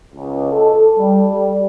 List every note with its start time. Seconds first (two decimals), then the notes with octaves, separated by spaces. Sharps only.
0.13 C#2
0.51 A4
0.97 G3
1.28 G3